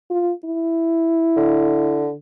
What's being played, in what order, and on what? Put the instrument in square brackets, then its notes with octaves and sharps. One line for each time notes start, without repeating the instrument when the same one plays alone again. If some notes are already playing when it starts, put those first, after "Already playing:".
[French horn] F4
E4
[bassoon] D3